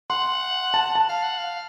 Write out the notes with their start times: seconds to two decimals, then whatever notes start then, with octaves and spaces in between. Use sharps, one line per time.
0.10 F#5 C6
0.74 A5
0.95 A5
1.09 F5
1.24 F#5
1.38 F5